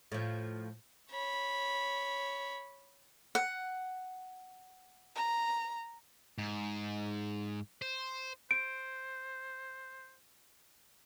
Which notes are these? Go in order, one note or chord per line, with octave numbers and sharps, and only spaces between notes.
A2 F3
C#5 B5
F#5
A#5
G#2
C5
C5 D7